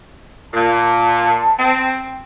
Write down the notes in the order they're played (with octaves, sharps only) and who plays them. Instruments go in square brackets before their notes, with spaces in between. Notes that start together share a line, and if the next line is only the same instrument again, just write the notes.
[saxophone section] A#2 [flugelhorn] A5
[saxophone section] C4